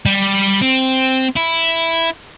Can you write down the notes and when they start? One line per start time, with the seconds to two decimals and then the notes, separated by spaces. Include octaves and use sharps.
0.06 G3
0.62 C4
1.36 E4